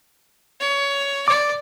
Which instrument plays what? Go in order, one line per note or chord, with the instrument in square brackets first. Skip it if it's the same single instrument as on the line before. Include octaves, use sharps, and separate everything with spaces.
[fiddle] C#5
[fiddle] D5 [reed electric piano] D6